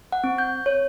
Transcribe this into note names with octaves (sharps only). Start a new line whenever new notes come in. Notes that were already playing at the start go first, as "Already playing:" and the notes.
F#5
C4
G6
C#5